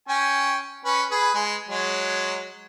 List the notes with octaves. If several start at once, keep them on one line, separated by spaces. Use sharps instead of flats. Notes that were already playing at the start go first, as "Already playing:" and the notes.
C#4 G5 G#5
C#4 B4
G#4 B4
G#3 G#5
F#3 G#3